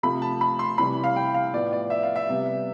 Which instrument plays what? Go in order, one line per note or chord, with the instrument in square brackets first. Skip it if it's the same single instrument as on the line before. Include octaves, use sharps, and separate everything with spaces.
[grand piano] C3 F3 A3 B5
A5
B5
C6
C3 E3 G3 B5
F5
G5
F5
A2 F3 B3 D5
D5
E5
F5
E5
C3 G3 B3